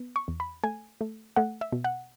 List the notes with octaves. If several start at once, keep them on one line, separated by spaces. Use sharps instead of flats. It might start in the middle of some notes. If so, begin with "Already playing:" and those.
Already playing: B3
C#6
E2
B5
A3 G#5
A3
A3 F#5
E5
B2
F#5